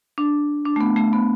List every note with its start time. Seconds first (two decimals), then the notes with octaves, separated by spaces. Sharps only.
0.18 D4
0.65 D4
0.76 A3
0.81 B3
0.96 A3
1.13 B3